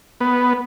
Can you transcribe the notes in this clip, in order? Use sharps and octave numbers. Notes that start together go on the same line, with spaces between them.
B3